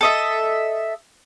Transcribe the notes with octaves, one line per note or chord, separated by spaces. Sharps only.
A4 D#5 E5